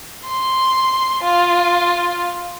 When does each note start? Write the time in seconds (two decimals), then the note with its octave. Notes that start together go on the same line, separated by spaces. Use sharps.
0.25 C6
1.23 F4